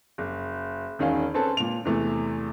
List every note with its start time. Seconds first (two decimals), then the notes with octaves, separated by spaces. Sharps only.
0.18 F#1
0.99 E1 D#3 C#4 F5
1.34 C4 C#4 A4 B4 A5
1.57 A#2 F7
1.85 E2 C3 E3 A3